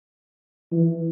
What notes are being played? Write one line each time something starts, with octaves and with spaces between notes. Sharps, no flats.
E3